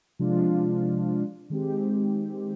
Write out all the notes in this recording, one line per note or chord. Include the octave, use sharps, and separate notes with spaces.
C3 F3 G#3 D4 F4
D#3 G#3 C4 G4